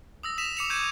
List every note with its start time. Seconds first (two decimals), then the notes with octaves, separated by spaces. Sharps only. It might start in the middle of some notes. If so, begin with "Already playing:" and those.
0.23 D#6 E6 A#6
0.38 D#6 B6 E7 F7
0.57 D6 C#7 F7
0.70 C#6 D#6 G6 G#6 D#7 E7